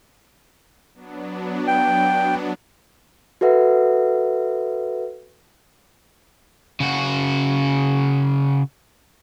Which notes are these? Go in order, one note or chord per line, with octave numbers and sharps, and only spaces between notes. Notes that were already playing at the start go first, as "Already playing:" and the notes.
F#3 B3 D4
G5
F#4 A4 B4 E5 F#5
C#3 F#4